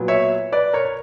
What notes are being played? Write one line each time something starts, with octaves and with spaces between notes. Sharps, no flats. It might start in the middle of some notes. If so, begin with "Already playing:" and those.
Already playing: A#2 F#3 B3
C#5 E5
B4 D5
A#4 C#5
C#5